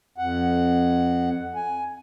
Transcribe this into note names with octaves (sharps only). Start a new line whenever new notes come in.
F2 F#5
G#5